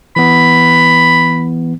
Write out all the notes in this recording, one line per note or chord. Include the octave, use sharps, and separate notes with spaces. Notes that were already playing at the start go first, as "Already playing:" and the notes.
E3 B3 B5